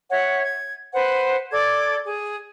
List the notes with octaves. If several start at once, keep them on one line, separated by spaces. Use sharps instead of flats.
C#5 E5 F#5
G#6
B4 C5 F#5
A4 D5 D6 G#6
G#4